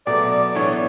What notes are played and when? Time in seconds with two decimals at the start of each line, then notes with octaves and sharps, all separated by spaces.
0.06 B2 F#3 A3 D5
0.31 D5
0.55 A2 E3 B3 D4 C#5